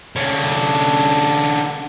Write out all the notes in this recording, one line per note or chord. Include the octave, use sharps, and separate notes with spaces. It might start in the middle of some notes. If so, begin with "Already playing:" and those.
D3 C#4